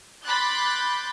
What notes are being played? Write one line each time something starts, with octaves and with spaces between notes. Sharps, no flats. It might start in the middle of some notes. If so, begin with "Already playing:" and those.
B5 C6 D6 F#6 G6 A6